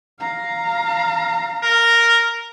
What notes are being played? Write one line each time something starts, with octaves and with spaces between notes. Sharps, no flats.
F5 A#5
A#4